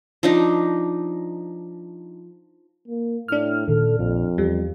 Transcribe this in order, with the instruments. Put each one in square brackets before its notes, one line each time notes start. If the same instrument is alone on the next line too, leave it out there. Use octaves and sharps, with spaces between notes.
[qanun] F3 D4 D#4
[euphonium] A#3
[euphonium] A2 [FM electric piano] D4 F6
[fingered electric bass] A#2 D#3 [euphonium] A4
[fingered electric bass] A#1 A#2 [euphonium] F2
[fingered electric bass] E2 [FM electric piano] G3